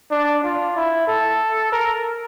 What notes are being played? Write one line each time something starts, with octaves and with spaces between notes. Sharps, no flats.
D4
F4
E4
A4
A#4